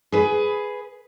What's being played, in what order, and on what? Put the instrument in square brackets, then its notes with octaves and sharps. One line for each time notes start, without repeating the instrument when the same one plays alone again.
[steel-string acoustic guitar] G#4 B4